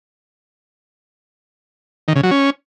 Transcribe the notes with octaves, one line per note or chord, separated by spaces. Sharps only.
D#3
C#3
F#3
C#4